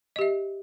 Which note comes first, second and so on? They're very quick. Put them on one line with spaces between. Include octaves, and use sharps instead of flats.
D#5 G4 E5